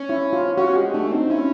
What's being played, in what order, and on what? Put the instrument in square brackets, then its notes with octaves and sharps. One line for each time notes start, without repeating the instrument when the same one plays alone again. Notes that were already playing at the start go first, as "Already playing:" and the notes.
Already playing: [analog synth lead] C#4
[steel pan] E4
F4
[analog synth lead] C#4 [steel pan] F#4
[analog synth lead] G#3 [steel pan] G4
[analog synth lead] A3 [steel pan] D4
[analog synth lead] C4 [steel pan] D#4
[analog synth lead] C#4 [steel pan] E4